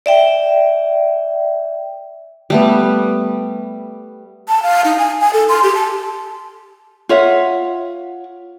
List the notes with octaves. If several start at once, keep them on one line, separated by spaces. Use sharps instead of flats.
D5 E5 G5
G3 A3 B3
A5
F5
D#4
G#5
G#5
A4
C6
G4
A5
F4 C#5 E5 F#5